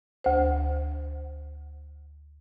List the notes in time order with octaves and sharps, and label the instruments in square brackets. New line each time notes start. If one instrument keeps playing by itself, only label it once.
[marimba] D2 C5